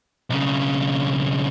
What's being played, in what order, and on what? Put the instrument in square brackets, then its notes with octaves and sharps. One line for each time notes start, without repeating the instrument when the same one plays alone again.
[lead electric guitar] B1 C#3